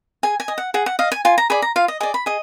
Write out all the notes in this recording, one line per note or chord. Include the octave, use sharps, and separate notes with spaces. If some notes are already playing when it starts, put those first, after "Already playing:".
G#4 G#5
G#5
D#5
F#5
G#4 F#5
F#5
D#5 F5
G#5
F4 G#5
A#5
G#4 D5 B5
A#5
F4 F5
D#5
G#4 D5 D#5
B5
G#4 D#5